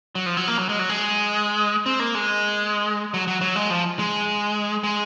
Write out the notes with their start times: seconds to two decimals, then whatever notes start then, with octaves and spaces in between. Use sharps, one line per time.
0.15 F#3
0.26 F3
0.37 F#3
0.48 A#3
0.58 F#3
0.69 G#3
0.79 F#3
0.89 G#3
1.86 C4
1.99 A#3
2.15 G#3
3.14 F#3
3.28 F#3
3.41 F#3
3.56 G#3
3.70 F3
3.99 G#3
4.84 G#3